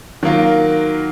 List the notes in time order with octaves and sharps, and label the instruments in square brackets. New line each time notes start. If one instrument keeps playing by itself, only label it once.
[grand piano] D#3 F#3 A#3 F4